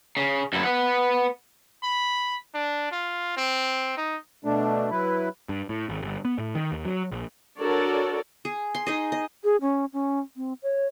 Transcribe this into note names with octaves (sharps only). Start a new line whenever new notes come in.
C#3
F#2 E4
B4 F#5
B5
D4
F4
C4
D#4
B2 A3 D4
F#3 E4 B4
G2
A2
G#1
G1
B3
A2
D#3
D#2
F#3
A#1
D4 F#4 A4 A#4 C#5 D5
G#4
C6
D#4 G#4 D#5
D#5
G#4
C#4
C#4
C4
C#5